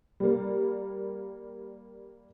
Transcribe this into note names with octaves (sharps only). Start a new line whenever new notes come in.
G3 A#3